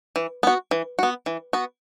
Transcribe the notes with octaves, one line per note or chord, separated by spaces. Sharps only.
E3
B3 F#4
E3
B3 F#4
E3
B3 F#4